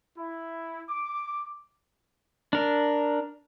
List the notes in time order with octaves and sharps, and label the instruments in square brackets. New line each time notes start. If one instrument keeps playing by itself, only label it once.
[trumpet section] E4
D6
[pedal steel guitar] D4 A#4